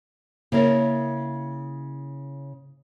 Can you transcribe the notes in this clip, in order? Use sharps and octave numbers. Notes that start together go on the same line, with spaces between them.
C#3 A#3 E4 A#4 C#5